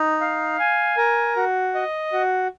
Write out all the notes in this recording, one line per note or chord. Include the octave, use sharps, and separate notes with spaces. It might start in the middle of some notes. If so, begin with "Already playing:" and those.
Already playing: D#4
F5
G#5
A#4
F#4
D#5
F#4